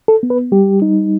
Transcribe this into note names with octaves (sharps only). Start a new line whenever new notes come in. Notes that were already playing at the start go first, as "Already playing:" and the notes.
A4
B3
B4
G3 G4
D#4